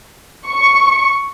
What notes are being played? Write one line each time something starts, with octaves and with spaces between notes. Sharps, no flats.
C#6